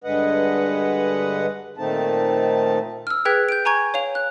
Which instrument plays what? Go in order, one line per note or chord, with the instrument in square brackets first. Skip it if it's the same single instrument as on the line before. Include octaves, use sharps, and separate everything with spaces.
[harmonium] G2 D3 G#3 B4 D#5 F#5
A#2 D#3 A3 C4 D#4 A5
[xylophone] E6 F6
G#4 B4 G5 F#6 G#6 B6
G6 D7
G#5 A#5 C#6 G#6
C#5 F5 F7
F#6